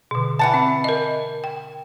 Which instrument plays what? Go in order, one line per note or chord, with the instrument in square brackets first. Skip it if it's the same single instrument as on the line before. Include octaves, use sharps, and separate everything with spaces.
[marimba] B2 D3
[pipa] E3 F#5 A5
[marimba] C4
A#4 D#5
G5